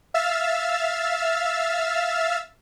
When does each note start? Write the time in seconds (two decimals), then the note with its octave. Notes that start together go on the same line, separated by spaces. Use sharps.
0.14 E5 F5 E6 F6 A6